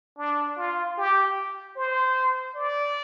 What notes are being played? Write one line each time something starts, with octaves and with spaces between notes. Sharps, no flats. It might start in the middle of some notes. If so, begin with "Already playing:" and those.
D4
F4
G4
C5
D5